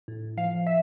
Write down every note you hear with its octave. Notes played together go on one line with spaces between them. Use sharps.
A2
F3 F5
E5